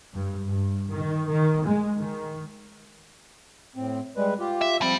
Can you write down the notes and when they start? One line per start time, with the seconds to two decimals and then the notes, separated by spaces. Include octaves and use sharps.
0.14 G2
0.47 G2
0.92 D#3
1.31 D#3
1.66 G#3
2.00 D#3
3.76 A2 C4
4.16 G3 G#3 B4
4.40 F4 G4
4.61 E5
4.82 F3 G3 C4